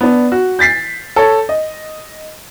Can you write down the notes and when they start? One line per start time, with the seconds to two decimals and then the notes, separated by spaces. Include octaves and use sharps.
0.01 B3 D4
0.32 F#4
0.59 G6 A6 B6 C7
1.16 A4 C#5
1.49 D#5